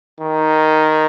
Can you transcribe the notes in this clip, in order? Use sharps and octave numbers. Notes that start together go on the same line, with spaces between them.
D#3